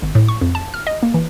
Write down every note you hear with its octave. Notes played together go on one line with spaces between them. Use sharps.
G#1
A2
C#6
F2
A5
F6
D#5
A#3
E3